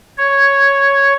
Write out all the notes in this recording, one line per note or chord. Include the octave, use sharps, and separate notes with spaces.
C#5